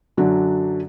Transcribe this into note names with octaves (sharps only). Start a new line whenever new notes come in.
F#2 D3 F#3 D4 F#4